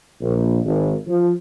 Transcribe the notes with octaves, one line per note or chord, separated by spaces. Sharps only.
A#1
G#1
F3